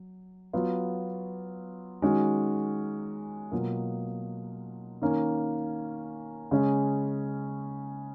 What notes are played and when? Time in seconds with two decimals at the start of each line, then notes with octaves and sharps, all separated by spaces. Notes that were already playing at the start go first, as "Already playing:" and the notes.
Already playing: F#3
0.53 F#3 B3 F4
2.02 D#3 G#3 C#4 F#4
3.51 B2 F#3 A#3 F4
5.02 D#3 A#3 C#4
6.51 C#3 G#3 C#4